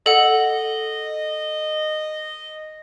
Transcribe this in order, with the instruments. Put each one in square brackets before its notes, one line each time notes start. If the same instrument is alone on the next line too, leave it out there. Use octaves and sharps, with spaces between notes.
[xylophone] A4 F#5 [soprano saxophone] D#5